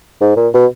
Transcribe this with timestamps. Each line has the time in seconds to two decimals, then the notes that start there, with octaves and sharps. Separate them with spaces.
0.21 G#2
0.36 A#2
0.54 B2